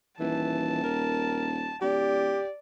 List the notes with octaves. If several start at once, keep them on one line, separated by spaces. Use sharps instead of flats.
D#1 E3 A5
A#4
D1 G4 D5